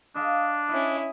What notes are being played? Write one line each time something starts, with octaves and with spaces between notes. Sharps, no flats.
D4 D#5 F5 G#5
C#4 E4 D#5